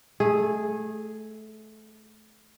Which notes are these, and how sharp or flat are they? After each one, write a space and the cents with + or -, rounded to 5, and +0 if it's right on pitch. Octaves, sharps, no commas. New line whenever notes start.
A3 -20 G#4 +0